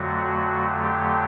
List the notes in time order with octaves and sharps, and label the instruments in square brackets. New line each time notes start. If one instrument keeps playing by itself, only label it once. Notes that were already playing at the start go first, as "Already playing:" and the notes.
Already playing: [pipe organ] F2 D3 F#3 A3 F#4
G4